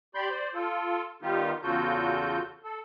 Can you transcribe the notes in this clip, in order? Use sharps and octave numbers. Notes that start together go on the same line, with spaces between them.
G4 D5 B5 C6 G6
C5 D5
F4 A4
D#3 G3 B3 D#4 F4 G4
E2 C#3 F4 F#4 A4 G6
A4